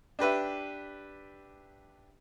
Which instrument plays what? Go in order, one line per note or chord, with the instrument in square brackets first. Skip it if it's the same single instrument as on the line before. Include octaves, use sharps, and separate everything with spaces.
[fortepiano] D4 G4 B4 E5